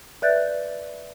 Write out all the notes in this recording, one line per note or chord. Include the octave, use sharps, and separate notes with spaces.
B4 D5 E5 F#6 G6 A6